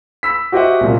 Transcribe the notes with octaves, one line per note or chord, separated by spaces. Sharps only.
B5 E6 B6
F#4 G4 C5 D#5 E5 F#5
C2 A#2